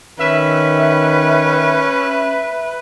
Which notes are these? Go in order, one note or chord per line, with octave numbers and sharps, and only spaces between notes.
D#3 C#4 B4 E5